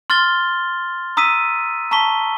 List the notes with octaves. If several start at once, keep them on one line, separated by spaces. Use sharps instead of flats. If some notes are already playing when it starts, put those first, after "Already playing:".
C6 F6 A6 G7
A#5 D#6 E6 B6 D#7
A5 A#5 C#6 B6 G7